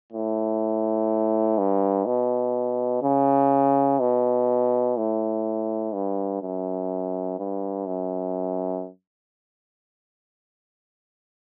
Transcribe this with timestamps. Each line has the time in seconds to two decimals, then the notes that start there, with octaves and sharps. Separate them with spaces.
0.12 A2
1.58 G2
2.06 B2
3.03 C#3
4.00 B2
4.97 A2
5.93 G2
6.42 F#2
7.39 G2
7.87 F#2